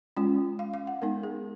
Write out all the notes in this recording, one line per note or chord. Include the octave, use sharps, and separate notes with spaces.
G#3 C#4 F4
F5
F5
F#5
G#3 B3 D#4 A#4
G#4